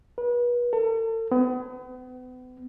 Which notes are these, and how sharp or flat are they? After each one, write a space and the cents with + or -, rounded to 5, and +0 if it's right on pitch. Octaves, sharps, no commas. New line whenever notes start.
B4 -35
A4 +40
B3 +40